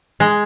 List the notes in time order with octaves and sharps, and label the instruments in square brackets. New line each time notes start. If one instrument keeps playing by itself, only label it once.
[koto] G#3